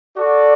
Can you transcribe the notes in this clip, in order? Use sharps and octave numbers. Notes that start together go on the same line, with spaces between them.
F#4 A4 D5